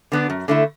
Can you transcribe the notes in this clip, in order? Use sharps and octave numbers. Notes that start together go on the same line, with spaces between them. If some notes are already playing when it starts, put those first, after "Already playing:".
D3 B3 D4
F#2
D3 A3 E4